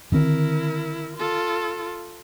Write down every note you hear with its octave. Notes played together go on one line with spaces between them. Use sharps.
D3 D#3 C4 E4 A#4
F4 A4